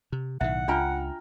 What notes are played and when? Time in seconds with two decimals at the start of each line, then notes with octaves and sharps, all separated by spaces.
0.12 C3
0.41 B1 A2 D#3 E5 F#5
0.68 C#2 D4 F4 G5 G#5 A#5 F6